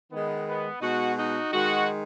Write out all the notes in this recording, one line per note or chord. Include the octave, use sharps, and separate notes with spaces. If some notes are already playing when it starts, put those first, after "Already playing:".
D#3 G#3 B3
B3
B2 G#3 D#4 F#4
D#4 F#4
D#3 G#3 D#4 F#4